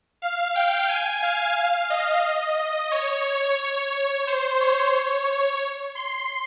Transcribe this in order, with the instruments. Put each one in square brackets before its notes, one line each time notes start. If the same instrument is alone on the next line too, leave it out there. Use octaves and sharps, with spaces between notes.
[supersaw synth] F5
G5
G#5
F5
D#5
D#5
C#5
C#5
C#5
C#5
C5
C#5
C6